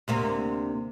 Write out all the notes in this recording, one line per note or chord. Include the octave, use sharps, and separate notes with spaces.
D2 C3 A#3